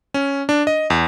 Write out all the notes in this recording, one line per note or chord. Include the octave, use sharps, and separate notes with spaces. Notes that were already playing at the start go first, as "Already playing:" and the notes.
C#4
D4
D#5
E2